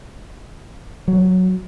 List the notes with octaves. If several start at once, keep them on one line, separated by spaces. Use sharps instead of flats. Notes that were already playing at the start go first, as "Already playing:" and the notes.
F#3